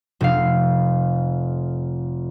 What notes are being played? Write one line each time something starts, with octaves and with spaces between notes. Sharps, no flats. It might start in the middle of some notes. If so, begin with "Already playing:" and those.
F1 F5